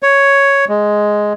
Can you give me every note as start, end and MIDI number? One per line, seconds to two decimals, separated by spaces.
0.03 0.65 73
0.69 1.33 56